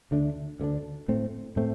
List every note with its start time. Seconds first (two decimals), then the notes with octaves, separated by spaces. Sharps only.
0.11 D2 D3 A3 D4
0.60 D2 D3 A3 D4
1.08 A2 A3 C4
1.56 A2 A3 C4